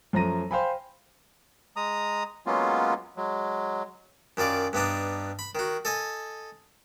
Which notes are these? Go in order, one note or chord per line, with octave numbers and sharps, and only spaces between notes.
F#2 F3 A3 A#5 A#6 D#7
C5 F5 G5 G#5 B5
G#3 A#5 D#6
F#3 G#3 A#3 B3 C#4 F4
F#3 G#3
F#2 D#3 F4 D5
G2 B3 D4 D#4
B5
D#3 F#4
A4 D#5 G#5